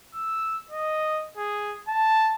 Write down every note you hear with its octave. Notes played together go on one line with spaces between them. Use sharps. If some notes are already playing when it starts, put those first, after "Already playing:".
E6
D#5
G#4
A5